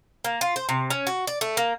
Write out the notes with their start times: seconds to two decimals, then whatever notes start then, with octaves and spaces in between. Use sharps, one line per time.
0.24 A#3
0.41 F4
0.56 C5
0.69 C3
0.90 C#4
1.07 F#4
1.27 D5
1.41 A3
1.57 A#3